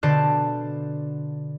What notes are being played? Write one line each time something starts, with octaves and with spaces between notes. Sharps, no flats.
B2 D3 C5 D5 A5 F#6